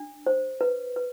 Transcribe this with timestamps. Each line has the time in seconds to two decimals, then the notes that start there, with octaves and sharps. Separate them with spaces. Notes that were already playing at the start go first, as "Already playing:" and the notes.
Already playing: D4
0.26 C5
0.61 B4
0.96 B4